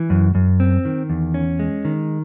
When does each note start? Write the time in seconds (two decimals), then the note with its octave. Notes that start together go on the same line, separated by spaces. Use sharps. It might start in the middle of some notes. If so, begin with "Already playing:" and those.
Already playing: E3
0.10 F#2
0.35 F#2
0.60 C4
0.85 D#3
1.10 E2
1.34 C#4
1.59 G#3
1.85 D#3